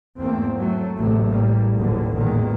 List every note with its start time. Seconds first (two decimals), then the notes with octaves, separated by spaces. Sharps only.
0.20 E2 G#2 A3 A#3 C4
0.57 F#3 A3
0.98 A1 E2 A2 C3 F#3 A3
1.29 A2 G3 A#3
1.79 F#1 D#2 A#2 D3 E3
2.14 A1 E2 A#2 D#3 G#3